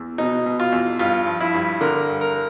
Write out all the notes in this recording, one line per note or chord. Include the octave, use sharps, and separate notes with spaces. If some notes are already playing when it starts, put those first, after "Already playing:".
Already playing: E2
B2 D#4
B2
F4
E2
G2 F4
F3
E4
G2
D3 A#4
G2
A#4